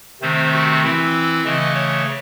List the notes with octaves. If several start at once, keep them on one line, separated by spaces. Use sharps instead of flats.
C3 D#3 A3 C4 C5
F#4
E3 C4 E4
C#3 E3 A3 D#5
C#5